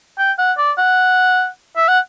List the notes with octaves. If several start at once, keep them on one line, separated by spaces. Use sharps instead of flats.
G5
F#5
D5
F#5
E5
F#5